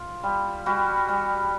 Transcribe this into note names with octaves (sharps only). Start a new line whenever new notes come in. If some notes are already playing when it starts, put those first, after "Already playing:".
Already playing: F4
G3
G3 F#4
G3